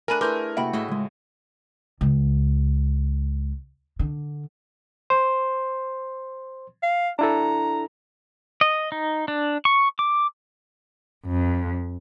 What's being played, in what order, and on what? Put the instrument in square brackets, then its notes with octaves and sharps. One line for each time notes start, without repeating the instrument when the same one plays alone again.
[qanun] A3 D4 [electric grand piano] A#4 D#7 [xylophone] G#5 B5 F#6
[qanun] A3 E4 G#4 [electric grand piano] A#4 G6 [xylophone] B4 C6 D6
[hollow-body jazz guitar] C3 A#3 E5 [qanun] F#4 [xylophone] G5 B5
[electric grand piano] A2 [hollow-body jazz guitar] A3 [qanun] G#4 D#5 E5
[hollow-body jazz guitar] C#2 G#3
[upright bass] C#2
D3
[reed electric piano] C5 C6
[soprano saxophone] F5
[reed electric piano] D4 E4 A4 [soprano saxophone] A#5
[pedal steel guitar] D#5
D#4
D4
C#6
D6
[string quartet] F2